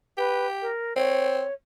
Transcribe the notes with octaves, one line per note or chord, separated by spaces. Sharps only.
G4 B4
A#4
C4 C#5